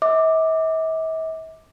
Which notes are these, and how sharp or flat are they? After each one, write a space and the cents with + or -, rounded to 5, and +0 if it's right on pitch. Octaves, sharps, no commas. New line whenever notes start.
E5 -45 D6 +5